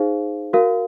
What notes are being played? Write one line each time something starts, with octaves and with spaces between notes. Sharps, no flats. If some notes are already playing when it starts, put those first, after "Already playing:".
Already playing: D#4 G#4 C5 F5
F#4 A#4 F5